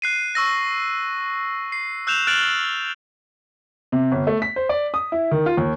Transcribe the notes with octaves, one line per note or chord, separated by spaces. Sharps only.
F#6 C7 D#7
C#6 E6 A#6
C7
E6 F#6 G6 E7 F7
F6 F#6 A6 D7 F7 F#7
C3
G1
A3
B6
C5
D5
D#6
E4
D#3
F4
D#2